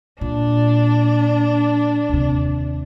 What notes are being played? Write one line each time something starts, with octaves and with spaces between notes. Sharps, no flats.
A#2 D4
D#2 C3